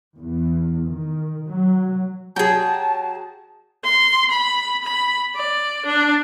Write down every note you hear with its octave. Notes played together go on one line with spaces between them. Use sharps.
E2
D#3
F#3
F#3 G#4 G5 A5
C6
B5
B5
D5
D4